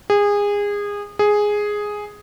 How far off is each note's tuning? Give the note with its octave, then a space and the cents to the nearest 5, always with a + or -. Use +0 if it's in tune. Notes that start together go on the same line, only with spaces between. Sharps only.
G#4 -25
G#4 +0